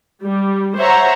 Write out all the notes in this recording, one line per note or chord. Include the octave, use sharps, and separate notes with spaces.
G3
C5 C#5 E5 F#5 A#5